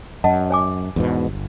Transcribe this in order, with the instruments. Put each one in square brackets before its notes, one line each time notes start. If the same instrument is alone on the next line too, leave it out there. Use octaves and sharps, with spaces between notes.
[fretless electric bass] F#2 [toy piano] D#5 F#5 A5
[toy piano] C#5 G#5 D6
[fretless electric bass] E2 G#2 B2
G1